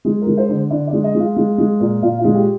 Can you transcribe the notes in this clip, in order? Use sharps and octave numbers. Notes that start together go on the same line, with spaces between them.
G#3 G#4
A#4
G#3
C5
D3
D3 D5
D5
G#3
D#5
G#3
F4
G#3
G#3
A#2
A#2 F4
F4
G#3
G4